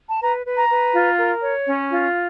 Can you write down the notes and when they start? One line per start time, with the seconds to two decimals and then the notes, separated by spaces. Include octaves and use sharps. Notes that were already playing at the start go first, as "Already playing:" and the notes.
0.10 A5
0.21 B4 A#5
0.46 B4
0.57 A#5
0.70 B4
0.94 F4
1.18 A#4
1.42 C#5
1.67 C#4
1.91 F4